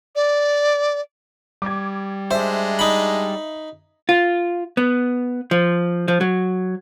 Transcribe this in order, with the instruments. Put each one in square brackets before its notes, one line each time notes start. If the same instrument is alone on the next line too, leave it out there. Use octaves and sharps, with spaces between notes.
[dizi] D5
[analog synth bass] G3 [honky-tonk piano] D6 G#6
[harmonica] G#3 D4 [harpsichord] C5 [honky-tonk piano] E5
[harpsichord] D#4 B5
[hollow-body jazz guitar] F4
B3
F3
F3
F#3